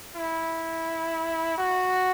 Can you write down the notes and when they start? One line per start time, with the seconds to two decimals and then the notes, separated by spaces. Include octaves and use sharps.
0.16 E4
1.58 F#4